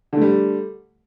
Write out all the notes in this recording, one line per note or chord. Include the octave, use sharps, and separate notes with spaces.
D3 G3 A3